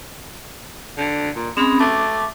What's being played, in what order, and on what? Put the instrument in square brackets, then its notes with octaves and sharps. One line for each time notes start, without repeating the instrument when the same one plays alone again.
[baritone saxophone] D3
A#2
[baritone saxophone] G#3 [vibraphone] C4 C#4 B5
[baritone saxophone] A3 [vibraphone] D6